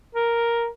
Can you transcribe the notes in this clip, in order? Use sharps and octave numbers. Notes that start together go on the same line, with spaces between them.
A#4